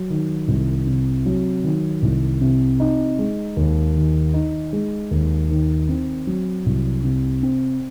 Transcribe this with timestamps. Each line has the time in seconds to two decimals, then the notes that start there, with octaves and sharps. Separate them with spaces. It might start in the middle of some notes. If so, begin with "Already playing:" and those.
Already playing: F#3
0.10 D#3
0.48 C2
0.86 C3
1.26 F#3
1.64 D#3
2.02 C2
2.41 C3
2.80 D#4
3.19 G#3
3.57 D#2
3.95 D#3
4.34 D#4
4.73 G#3
5.11 D#2
5.50 D#3
5.89 C4
6.27 F#3
6.66 C2
7.04 C3
7.42 C4